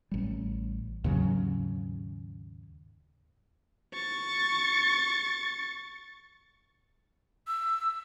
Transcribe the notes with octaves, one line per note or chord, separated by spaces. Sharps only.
A1 G3
D#2 G#2 C#3 F#3
C#6 A6
E6